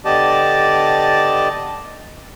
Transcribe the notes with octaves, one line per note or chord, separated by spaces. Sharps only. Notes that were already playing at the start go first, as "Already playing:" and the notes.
D3 B3 G4 D5 D#5 A5